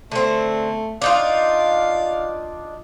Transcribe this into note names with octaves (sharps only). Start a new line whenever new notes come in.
D3 A3 C4
D4 D#4 F4 F5